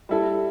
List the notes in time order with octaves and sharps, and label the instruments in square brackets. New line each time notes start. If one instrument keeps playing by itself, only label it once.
[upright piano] G3 E4 A4